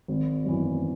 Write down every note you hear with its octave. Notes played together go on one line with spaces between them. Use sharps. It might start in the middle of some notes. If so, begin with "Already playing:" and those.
G#1
F#2 E3